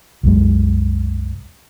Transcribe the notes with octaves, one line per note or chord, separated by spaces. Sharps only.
C2 F#2 G#3